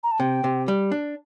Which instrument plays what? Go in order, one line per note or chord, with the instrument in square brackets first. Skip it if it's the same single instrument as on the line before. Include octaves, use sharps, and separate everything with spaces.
[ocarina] A#5
A5
[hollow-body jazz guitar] C3 [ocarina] G5
[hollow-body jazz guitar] C3
G3
D4